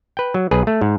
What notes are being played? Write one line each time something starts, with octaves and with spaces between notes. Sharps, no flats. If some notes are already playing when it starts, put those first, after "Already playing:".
B4 G5
F#3
B1 G#4 B4
A3
G#2